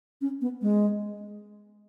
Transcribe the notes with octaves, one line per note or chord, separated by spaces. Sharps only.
C#4
B3
G#3